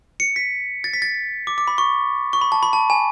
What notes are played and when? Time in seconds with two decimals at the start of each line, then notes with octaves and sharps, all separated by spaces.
0.20 C#7
0.36 B6
0.84 A6
0.93 B6
1.02 A6
1.47 D6
1.58 D6
1.68 B5
1.78 C#6
2.33 C#6
2.41 B5
2.52 A5
2.63 B5
2.73 A5
2.90 G#5